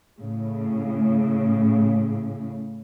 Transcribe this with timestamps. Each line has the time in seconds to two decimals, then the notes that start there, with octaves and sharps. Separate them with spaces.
0.19 A2 C#3